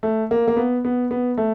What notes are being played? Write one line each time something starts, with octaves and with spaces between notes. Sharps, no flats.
A3
A#3
A#3
B3
B3
B3
A3